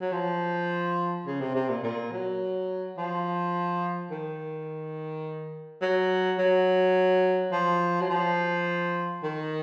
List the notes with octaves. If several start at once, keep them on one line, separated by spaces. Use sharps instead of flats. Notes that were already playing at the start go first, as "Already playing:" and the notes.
F#3
F3
C#3
C3
C3
A#2
A#2
F#3
F3
D#3
F#3
F#3
F3
F#3
F3
D#3